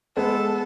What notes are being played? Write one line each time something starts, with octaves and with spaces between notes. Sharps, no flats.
G#3 B3 A4